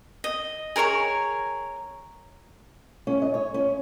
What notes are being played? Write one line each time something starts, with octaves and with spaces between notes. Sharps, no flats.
D#5
G#4 A#4 C#5 C#6
C#4
D#5
C#5
C#4